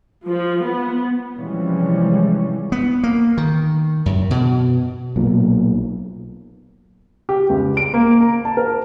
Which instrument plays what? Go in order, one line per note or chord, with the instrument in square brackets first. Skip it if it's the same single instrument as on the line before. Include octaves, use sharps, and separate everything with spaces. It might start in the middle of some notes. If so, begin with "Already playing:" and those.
[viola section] F3
B3
[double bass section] C3 E3 F3 G3 G#3 C#4
[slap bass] B3
A#3
D#3
F#2
B2
[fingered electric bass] B1 A#2
[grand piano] G4
C#2
D7
A#3
A#5
A5
A#4